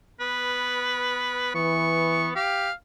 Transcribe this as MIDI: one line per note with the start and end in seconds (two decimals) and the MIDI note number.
0.20 1.51 59
0.20 1.54 71
1.55 2.32 52
1.55 2.35 59
1.55 2.29 85
2.36 2.68 67
2.36 2.73 77